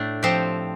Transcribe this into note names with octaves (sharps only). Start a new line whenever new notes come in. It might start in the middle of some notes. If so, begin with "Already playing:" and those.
Already playing: A2 A3 D4
F3 C4 G4